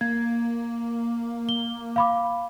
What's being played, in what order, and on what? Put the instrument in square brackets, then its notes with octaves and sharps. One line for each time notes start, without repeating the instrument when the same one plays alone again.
[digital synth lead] A#3 [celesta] G#6
[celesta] G7
F5 B5 D6